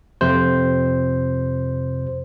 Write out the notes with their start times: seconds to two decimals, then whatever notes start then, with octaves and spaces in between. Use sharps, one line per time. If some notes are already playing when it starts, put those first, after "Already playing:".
0.21 F2 C3 C5